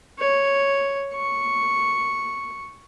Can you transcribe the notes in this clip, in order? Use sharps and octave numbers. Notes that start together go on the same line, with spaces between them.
C#5
C#6